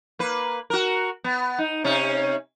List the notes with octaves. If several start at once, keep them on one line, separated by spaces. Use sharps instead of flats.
A#3 B4
F#4 A#4
B3
D#4
C3 C#4 D#4